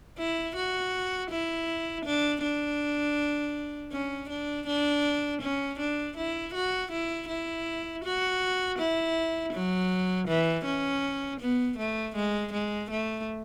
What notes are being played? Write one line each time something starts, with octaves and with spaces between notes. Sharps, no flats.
E4
F#4
E4
D4
D4
C#4
D4
D4
C#4
D4
E4
F#4
E4
E4
F#4
E4
F#3
E3
C#4
B3
A3
G#3
G#3
A3